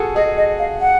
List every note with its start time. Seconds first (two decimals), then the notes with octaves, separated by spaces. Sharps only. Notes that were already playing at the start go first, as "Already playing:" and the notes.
Already playing: F#4 G#4 A4
0.15 G#4 D#5
0.37 D#5
0.59 F5
0.81 F#5